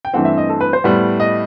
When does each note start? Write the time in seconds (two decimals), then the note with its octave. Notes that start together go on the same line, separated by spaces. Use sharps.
0.05 G5
0.13 G2 E3 A3 C4 F#5
0.25 E5
0.38 D#5
0.50 A4
0.61 B4
0.73 C5
0.84 A2 G3 B3
1.20 D#5